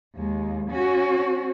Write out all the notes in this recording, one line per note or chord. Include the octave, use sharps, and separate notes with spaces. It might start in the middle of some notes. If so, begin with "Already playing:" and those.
D#2 G#3
C#4 F#4